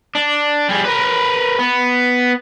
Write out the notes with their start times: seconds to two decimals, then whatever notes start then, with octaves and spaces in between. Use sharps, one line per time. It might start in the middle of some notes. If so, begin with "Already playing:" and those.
0.15 D4
0.69 G3 G#4
0.85 A#4 B4
1.59 B3